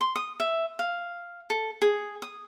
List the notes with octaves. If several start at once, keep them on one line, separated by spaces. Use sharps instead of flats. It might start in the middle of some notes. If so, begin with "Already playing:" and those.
C6
D#6
E5
F5
A4
G#4
D#6